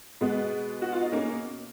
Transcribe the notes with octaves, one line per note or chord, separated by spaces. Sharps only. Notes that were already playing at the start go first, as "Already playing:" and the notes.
B2 G#3 B3
F#4
F4
D#4
A#3 C#4